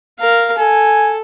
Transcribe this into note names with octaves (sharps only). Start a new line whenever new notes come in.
A#4 F5
A4 G#5